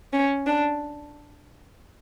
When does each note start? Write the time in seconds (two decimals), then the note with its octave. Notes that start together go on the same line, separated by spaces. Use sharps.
0.13 C#4
0.46 D4